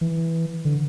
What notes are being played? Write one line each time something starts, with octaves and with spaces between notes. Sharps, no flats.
E3
D3